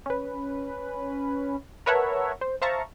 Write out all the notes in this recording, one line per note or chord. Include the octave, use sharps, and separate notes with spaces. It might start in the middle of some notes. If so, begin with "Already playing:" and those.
C#4 B4
A#4 B4 C#5 E5 F#5 A5
C5
C5 E5 F5 A5 A#5 C#6